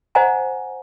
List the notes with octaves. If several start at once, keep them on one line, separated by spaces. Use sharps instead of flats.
C5 D#5 F#5 G#5 A#5